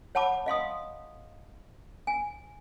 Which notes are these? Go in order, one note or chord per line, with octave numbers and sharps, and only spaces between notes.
C#5 F#5 A5 B5 D6
D#5 F5 C6 D#6
G#5